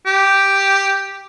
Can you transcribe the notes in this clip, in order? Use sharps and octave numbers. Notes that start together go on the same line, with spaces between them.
G4